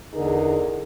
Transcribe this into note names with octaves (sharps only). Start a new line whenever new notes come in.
E2 D3 D#4 G#4 A#4